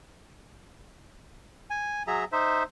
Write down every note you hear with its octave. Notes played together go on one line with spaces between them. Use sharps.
G#5
F#3 G#4 E5 A#5
D#4 C5 E5